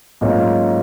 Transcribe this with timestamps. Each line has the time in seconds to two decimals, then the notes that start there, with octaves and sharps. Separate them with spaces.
0.21 G#2 F#3 A#3 C#4 F4